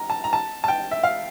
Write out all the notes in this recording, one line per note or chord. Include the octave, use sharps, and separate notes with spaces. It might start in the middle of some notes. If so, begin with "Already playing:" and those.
Already playing: A#5
A5
A#5
A5
A5
G5
E5
F5